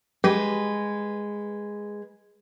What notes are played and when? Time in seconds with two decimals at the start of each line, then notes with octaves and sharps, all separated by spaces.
0.24 G#3 G4 B4